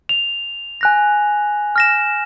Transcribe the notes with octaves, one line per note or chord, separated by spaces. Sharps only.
F7
G#5 F#6 A#6
F6 A#6 E7